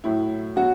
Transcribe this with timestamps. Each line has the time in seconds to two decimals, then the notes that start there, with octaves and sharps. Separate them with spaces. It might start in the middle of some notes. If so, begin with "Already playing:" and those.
0.04 A2 F#3 E4
0.56 B2 F#3 F#4